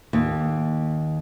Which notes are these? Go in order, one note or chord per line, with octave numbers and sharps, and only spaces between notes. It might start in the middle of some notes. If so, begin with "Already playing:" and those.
D#2